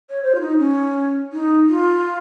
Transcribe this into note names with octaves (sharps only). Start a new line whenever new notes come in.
C#5
C5
F4
D#4
C#4
D#4
F4